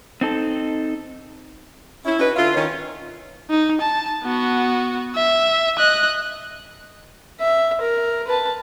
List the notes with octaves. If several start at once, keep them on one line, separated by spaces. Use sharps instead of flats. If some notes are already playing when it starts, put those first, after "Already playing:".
C4 D#4 A4
C#4 E4
C#4 D#4 F#4 B4
D3 E4 F4
D#3 C#4
D#4
A5
B3 F#4
E5
D#5 F#6
E5
A#4
B4 A5